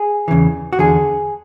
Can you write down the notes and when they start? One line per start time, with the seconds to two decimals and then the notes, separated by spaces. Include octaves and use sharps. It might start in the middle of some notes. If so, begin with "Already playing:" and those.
Already playing: G#4
0.28 E2 C#3 E3
0.73 F#4
0.79 E2 D3 G#4